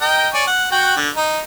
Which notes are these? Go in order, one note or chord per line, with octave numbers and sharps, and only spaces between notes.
A#4 D#5 G5
C#5 D5 G#5
F#5
F#4 F#5 G5
D3
D#4